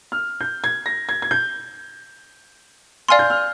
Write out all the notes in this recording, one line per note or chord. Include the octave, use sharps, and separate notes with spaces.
F6
G6
G#6
A#6
G#6
G#6
G6
D5 F5 G#5 C6 F6
G6
F6